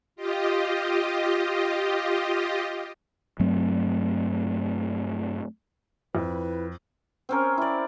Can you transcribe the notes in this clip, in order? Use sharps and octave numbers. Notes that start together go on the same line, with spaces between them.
F4 G4 D#5
G2 F#3 A3 C4
F2 E4 B4
C4 C#4 A#4
E4 D5